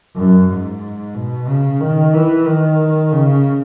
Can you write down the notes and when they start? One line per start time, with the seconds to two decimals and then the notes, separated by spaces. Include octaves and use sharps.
0.16 F#2
0.50 G#2
1.15 B2
1.48 C#3
1.80 D#3
2.14 E3
2.46 D#3
3.12 C#3